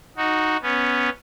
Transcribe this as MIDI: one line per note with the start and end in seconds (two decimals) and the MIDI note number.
0.17 0.57 63
0.17 0.57 66
0.62 1.09 59
0.62 1.09 61